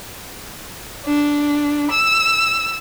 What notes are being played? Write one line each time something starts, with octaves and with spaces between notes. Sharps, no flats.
D4
E6